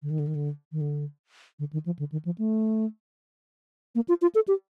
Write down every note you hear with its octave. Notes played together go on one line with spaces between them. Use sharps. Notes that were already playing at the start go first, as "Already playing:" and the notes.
D3
D#3
D3
D#3
D3
D#3
D3
D3
D#3
F3
D3
D#3
F3
A3
A#3
F4
F4
A4
G4